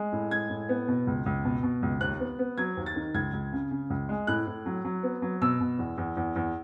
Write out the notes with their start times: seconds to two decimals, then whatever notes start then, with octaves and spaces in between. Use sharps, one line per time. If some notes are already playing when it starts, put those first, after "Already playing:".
Already playing: G#3
0.12 A2
0.31 G#3 G#6
0.50 A2
0.69 B3
0.88 B2
1.07 C#2
1.26 C#2
1.45 B2
1.63 B2
1.82 C#2
2.01 D#2 F#6
2.20 B3
2.39 B3
2.58 F#3 G#6
2.77 D#2
2.86 A6
2.96 D#3
3.14 C#2 G#6
3.33 C#2
3.52 C#3
3.71 C#3
3.90 C#2
4.09 G#3
4.27 A2 F#6
4.47 A2
4.66 F#3
4.84 F#3
5.03 B3
5.22 F#3
5.41 B2 E6
5.60 B2
5.79 E2
5.98 E2
6.17 E2
6.36 E2